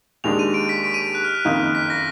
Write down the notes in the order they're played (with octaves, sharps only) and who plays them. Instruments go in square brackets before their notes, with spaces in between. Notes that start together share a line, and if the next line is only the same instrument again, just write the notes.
[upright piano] D#2 D#3 G#3 D4 [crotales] F7
[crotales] D#7
D7
B6
D7
D#7
D7
F#6
F6
F#6
[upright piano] F#1 F2 D#3 A#3 D#4
[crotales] B6
A#6